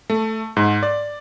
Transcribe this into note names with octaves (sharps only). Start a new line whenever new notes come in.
A3
G#2
D5